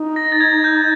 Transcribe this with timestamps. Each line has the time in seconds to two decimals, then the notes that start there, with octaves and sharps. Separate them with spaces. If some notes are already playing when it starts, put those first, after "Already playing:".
Already playing: D#4
0.16 A#6
0.32 A6
0.41 G#6
0.64 G6